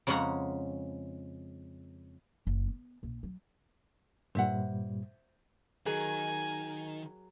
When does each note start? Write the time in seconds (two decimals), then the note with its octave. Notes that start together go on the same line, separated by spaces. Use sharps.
0.07 F2 C#3 G#3 C#4 F#5 A#5
2.47 F#1
2.67 B3
3.03 A#1
3.23 F#3
4.35 G2 A#2 G3 C5 E5 F#5
5.86 D#3 F#3 G#4 A#4 G#5